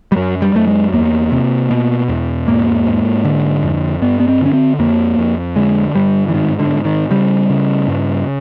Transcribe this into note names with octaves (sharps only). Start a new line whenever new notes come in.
G3
F#2 F#3
G3
F#2 A3
G#3
E2 A#3
C3
B2
E2
G#2 A#3
G#2
D3
F2
G2 B3
B3
C4
D3 C#4
C4
F2 A#3
F2
D3 G#3
G2 G3
E3
G#2 D#3
D3
G#2
D#3
C#3 G3
C#3
G2